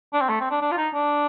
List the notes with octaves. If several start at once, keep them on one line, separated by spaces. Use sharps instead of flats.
D4
C4
A3
C4
D4
D4
F4
D#4
D4